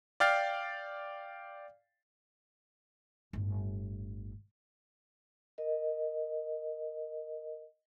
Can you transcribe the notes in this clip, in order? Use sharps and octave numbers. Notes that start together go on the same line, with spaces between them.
D5 F5 G5 F6 A6 C7
G1 A2
A#4 D#5